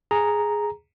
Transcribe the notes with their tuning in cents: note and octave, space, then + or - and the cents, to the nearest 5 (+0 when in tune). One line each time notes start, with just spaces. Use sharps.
G#4 +0 A#5 +0